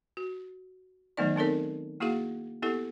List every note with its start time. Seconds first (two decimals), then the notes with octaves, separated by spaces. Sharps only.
0.17 F#4
1.17 D#3 F#3 A3 B3 D#4 D5
1.36 B3 C4 D#4 A4 A#4 C#5
2.00 A#3 E4 F#4 G#4 F5 F#5
2.62 B3 E4 G4 A4 F#5